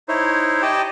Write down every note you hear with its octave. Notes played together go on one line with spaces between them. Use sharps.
D#4 E4 C5 C#5
G4 D5 D#5 G5 A5